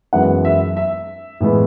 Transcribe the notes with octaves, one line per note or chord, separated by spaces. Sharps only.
F#2 E3 G#3 B3 F#5
E5
E5
A2 E3 G#3 B3